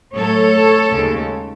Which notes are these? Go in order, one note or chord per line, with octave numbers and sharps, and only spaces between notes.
A2 F#3 A3 A4 C#5
D#2 C#3 G#3